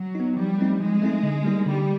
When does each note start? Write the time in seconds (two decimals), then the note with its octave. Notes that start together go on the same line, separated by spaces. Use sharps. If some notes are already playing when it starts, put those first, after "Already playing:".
Already playing: F#3
0.15 B3 D#4
0.37 F3 G3
0.58 A3 C4 D#4
0.80 F3 G#3
1.02 A3 C4 D#4
1.23 D3
1.44 G3 A#3 D#4
1.66 D3 G3